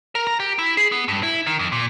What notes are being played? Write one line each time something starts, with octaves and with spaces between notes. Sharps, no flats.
A#4
A#5
G4
E4
G#4
B3
G2
E4
D#3
F2
A#2